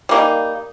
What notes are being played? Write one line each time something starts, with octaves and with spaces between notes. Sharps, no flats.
G3 A#3 D#4